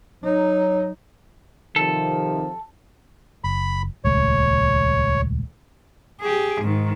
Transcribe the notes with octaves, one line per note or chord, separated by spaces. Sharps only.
F#3 D#4
C3 D#3 F3 A4
F#1 B5
D#1 C#2 A3 C#5
G4 G#4
G#2 D#3